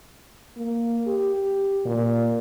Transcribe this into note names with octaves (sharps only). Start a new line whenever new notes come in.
A#3
G4
A#2